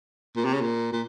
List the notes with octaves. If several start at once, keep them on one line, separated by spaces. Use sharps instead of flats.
A#2
C3
C#3
A#2
A#2